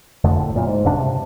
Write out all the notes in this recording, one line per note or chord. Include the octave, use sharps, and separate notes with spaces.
F1 F2 D3 A3
A2
F#2 A#2
G#2
D#1 G2 C#3 D4
C3